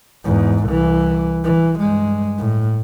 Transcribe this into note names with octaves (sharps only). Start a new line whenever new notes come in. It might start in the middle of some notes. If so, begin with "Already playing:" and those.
E2 G#2
C2 E3
E3
G2 G#3
A2